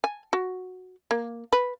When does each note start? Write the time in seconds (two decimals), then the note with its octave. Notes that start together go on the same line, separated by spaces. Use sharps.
0.04 G#5
0.33 F#4
1.11 A#3
1.53 B4